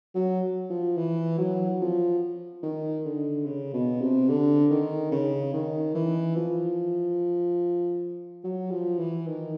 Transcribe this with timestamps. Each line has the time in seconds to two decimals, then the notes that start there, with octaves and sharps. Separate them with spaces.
0.15 F#3
0.70 F3
0.97 E3
1.38 F#3
1.81 F3
2.63 D#3
3.05 D3
3.46 C#3
3.73 B2
4.01 C3
4.28 D3
4.70 D#3
5.12 C#3
5.54 D#3
5.95 E3
6.36 F3
8.44 F#3
8.71 F3
8.99 E3
9.27 D#3